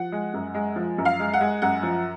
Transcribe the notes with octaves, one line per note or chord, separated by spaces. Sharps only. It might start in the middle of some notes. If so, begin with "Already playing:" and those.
Already playing: F3 F#5
G#3
F#2
G#3
F3
F#2
F5
G#3
F#5
G#3
F#2 F#5
F3